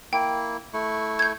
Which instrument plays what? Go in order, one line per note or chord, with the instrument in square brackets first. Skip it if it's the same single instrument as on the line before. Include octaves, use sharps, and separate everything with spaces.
[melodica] A#3 E4 [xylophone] G5
[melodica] A3 E4 C#6
[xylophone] G6 G#6